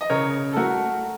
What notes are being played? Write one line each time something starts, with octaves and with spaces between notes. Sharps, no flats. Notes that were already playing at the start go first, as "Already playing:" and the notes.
D#5
C#3 A#4 C#5
A4
A3 F#4 A#4